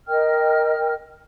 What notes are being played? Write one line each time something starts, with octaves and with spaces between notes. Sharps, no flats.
A#4 D#5 G5 F6